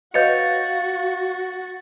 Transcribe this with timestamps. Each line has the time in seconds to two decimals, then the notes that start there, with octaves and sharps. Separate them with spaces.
0.14 F#4 B4 C#5 D#5 F5 G6 A6 C#7